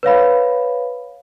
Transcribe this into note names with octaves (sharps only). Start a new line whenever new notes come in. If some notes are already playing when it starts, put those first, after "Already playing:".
B4 C#5 F5 B5